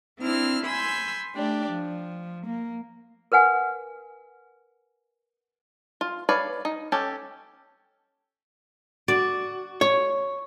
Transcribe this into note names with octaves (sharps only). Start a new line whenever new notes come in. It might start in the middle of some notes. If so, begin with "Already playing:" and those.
C4 D4 E4 F6
G#5 B5 C6 E6 G6
A3 D4 G4 D5
F3
A#3
A#4 B4 F#5 G#5
F4
B4 C#5 D5 F5
D#4
C#4 G4 A4
F#4 D5
C#5 C#6